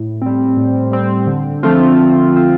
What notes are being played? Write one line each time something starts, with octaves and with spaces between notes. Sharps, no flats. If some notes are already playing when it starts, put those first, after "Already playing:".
Already playing: A2
G3 C4
A2
G3 C4
D3
F3 A3 C4 F4
D3
F3 A3 C4 F4